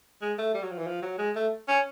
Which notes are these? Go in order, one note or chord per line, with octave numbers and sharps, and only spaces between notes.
G#3
A3
G3
F#3
F3
E3
F3
F#3
G#3
A3
C#4